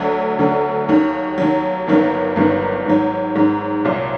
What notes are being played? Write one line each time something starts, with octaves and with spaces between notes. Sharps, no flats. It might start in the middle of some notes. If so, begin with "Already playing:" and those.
Already playing: D2 D3 F#3
D2 D3 F#3
D#2 D#3 F#3
D#2 D#3 F#3
G1 G2 D#3 F#3 A#3
G1 G2 D#3 F#3 A#3
G#2 D#3 F#3
G#2 D#3 F#3
C2 A#2 F#3